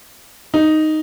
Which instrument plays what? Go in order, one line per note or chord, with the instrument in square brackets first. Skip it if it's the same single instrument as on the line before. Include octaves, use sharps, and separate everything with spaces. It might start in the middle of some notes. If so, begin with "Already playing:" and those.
[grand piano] D#4